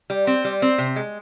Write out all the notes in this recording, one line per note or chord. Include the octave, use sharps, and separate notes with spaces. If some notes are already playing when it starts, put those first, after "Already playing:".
G3
C4
G3
C4
C3
G#3